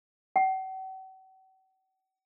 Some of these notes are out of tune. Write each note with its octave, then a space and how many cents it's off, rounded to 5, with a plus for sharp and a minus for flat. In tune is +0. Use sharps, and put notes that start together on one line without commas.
F#5 +45